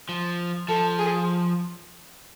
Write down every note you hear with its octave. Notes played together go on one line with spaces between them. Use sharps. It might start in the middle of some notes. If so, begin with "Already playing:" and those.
F3
F3 A4
G#4